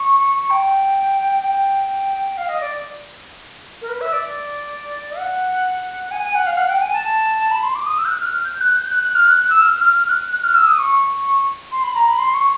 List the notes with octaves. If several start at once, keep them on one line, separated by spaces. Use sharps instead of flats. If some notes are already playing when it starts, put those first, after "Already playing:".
Already playing: C#6
G5
G5
F5
D#5
D5
A#4
B4
E5
D5
F#5
G#5
G#5
F#5
F5
F#5
G5
G#5
A5
B5
C6
D6
D#6
E6
G6
F#6
F6
G6
F#6
G6
F#6
F#6
F6
F#6
F#6
E6
F6
F6
F6
F#6
F#6
F6
E6
D#6
C#6
C6
B5
A#5
B5
C6
C#6